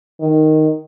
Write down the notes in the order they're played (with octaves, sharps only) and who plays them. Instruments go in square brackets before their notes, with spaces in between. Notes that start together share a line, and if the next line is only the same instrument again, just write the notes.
[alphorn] D#3